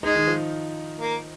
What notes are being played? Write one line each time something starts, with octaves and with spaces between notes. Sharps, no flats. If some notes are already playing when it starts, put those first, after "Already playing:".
G#3 D#4
D#3
F3
A#3